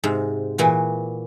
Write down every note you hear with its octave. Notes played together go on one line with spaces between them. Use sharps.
G#2 C3
A#2 E3 F#4